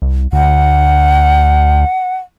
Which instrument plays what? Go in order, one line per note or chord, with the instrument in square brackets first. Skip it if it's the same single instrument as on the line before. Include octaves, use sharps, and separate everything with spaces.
[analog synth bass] C2
[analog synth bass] D2 [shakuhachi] F#5